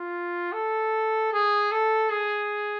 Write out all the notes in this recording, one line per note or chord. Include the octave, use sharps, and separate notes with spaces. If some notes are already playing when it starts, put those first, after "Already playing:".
Already playing: F4
A4
G#4
A4
G#4